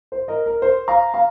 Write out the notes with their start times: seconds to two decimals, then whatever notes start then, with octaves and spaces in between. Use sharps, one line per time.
0.12 C5
0.28 A#4 D#5
0.46 A#4
0.62 C5
0.88 F5 A#5
1.14 F5 A#5